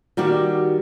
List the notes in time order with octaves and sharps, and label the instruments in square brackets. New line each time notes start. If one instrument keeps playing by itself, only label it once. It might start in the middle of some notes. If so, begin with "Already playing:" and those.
[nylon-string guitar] D#3 G3 F#4 G4